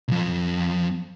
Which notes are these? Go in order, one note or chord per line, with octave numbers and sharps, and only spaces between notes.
B1 F2